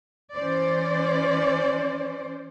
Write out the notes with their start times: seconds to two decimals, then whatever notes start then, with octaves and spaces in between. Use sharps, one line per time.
0.34 E3 C#4 C5 D5